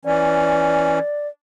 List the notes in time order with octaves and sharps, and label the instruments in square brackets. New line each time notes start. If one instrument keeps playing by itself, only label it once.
[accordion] E3 C#4 [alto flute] D5